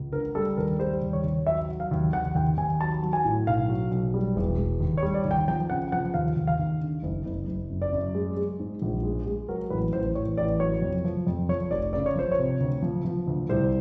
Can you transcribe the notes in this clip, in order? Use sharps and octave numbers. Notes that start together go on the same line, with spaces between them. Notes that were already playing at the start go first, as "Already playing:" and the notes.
Already playing: C#2
D3 A#4
G3 A4
D#2 A#4
G3 C5
D#2
C#5
D#2
F#3 E5
F#3
F5
D#2
D#2 F#5
D#2 G5
D#2 G#5
F#3 A5
F#3
G#5
A2
B1 F5
F#3
B1
G3
E1
E1
D#2
C#5
G3
D5
D#2
G5
F3 G5
C#3 F#5
F3 F#5
D#2 F5
D#2
F5
D#2
D3
F#1
F#1
F#1
F#2
D5
F#2
G#3
G#3
G#2
A#1
G#3
G#3
F#3 A#4
A1 B4
A1 C5
A1 C#5
A1 D5
F#3 C#5
F2
F3
F2
F3 C#5
F1 D5
C#3 D5
C#5
F3 C5
C#5
C3
D2
F3
F3
D2
C2 C5